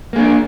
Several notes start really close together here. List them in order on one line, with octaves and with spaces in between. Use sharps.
A#3 G#4 D4